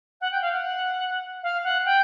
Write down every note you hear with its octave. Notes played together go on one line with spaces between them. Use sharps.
F#5
G5
F5
F#5
F5
F#5
G5